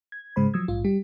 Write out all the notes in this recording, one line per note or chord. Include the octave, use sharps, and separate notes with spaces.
G#6
G#2 C#3 G#3 C5 B5
F3 F#3 D#6 E6 G#6
A#1 G#2 F4
G3 G4